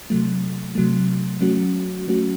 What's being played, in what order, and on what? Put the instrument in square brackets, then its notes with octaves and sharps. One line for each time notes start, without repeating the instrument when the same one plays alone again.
[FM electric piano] C3 F#3 A3
C3 F#3 A3
F#3 A3 C#4 F#4
F#3 A3 C#4 F#4